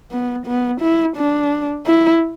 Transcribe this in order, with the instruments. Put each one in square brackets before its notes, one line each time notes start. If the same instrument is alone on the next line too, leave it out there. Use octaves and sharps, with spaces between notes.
[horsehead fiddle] B3
B3
E4
D4
E4